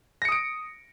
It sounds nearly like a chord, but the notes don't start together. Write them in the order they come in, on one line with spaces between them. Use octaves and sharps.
A#6 C#7 D#6 D7